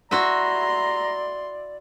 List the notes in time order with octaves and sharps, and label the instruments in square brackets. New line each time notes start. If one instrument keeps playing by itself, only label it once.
[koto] E4 F#4 E5 [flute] D5 [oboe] A#5 [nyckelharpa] C6